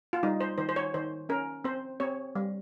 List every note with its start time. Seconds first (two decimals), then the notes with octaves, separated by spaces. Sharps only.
0.13 F4
0.23 G3 D#4
0.41 C5
0.58 D#3 C5
0.69 C5
0.76 C#5
0.94 D#3 C5
1.29 C#4 A#4
1.64 C4 C5
2.00 C4 C#5
2.35 G3